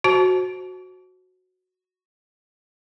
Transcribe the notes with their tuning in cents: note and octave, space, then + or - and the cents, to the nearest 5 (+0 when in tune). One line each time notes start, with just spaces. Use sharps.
F#4 -5 C5 +0 A5 -20